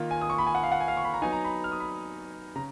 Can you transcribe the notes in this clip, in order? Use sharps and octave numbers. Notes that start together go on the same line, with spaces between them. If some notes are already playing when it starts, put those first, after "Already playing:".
Already playing: D#3 A#3 F4
G#5
D#6
C#6
B5
G#5
F#5
F5
F#5
G#5
F5
C#6
B5
A#5
F#3 B3 D#4 G#5
A#5
B5
F6
D#6
B5
C#3 A#5